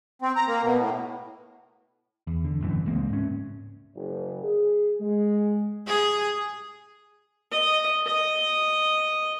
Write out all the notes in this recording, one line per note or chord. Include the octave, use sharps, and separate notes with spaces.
C4
A#5
A#3
B2
A2
E2
D3
A1 F#2 E3
C#2 G#3 A#3 C4
G#2 C#4
F#1
G#4
G#3
G#4
D#5
D#5